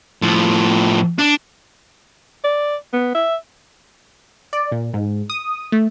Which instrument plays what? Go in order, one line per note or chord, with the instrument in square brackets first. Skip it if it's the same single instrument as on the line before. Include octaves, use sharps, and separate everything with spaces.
[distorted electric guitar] A2 F3
D4
[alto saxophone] D5
B3
E5
[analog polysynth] D5
A#2
G#2
D#6
A3